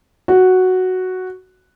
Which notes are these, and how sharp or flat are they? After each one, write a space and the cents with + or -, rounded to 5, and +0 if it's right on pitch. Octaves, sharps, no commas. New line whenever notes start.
F#4 +0